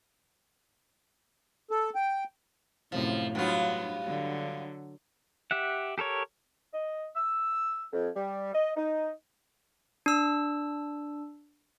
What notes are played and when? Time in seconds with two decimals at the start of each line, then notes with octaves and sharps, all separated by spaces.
1.71 A4
1.95 G5
2.92 F#2 A2 C3 F3
3.35 G2 F#3 B3 F4
4.06 D3 F#3
5.51 G4 E5 F#5
5.98 G4 A4 A#4 C#5
6.73 D#5
7.16 E6
7.93 F2
8.15 G3
8.54 D#5
8.76 D#4
10.06 D4 E6